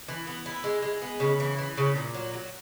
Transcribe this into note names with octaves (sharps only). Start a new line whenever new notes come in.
E3
B3
E4
G#3
G#3
B3
C#3
E3
E3
C#3
A#2
F#3
F#3